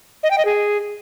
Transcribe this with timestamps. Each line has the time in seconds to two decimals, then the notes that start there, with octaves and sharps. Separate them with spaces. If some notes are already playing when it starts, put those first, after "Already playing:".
0.23 D#5
0.31 G5
0.38 D#5
0.45 G#4